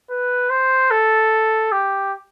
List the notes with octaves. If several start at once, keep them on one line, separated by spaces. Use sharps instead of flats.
B4
C5
A4
G4